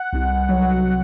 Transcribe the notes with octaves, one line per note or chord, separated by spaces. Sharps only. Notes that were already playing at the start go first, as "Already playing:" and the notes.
Already playing: F#5
C2
F#3